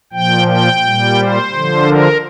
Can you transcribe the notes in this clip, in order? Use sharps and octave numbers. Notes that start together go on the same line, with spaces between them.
A#2 F3 G5
G5
A#2 G3
C5
D3 F3
A#4